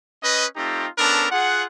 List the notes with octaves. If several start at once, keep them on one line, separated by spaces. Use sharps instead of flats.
C#4 B4 D#5
A3 C4 D#4 F4 G4
B3 C#4 D4 A4 A#4
F4 G#4 F#5